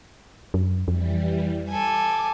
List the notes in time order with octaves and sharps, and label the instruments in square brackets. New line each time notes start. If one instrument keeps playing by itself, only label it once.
[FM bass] F#2
[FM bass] F2 [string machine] E3 G3
[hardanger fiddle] A4 G#5 [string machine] D6